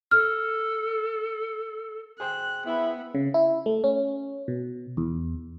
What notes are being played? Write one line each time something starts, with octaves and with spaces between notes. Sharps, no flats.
A4 F6
G#4 C5 G5 F#6
B3 E4
C#3
E4
A3
C#4
B2
E2